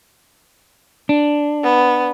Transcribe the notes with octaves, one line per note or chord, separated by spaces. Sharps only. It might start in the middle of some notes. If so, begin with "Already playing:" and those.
D4
B3